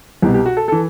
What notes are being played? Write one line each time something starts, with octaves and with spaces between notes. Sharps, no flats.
C2 B2 G4
G4
F#4
A4
E3 A4